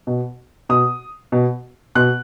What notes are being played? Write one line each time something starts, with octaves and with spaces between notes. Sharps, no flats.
B2
B2 D#6
B2
B2 F#6